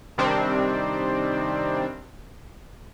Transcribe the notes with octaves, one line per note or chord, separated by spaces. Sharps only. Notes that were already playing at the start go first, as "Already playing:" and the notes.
C3 D#3 G3 C4 D4